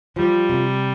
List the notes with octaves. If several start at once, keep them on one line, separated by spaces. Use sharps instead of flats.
F3 G3
C3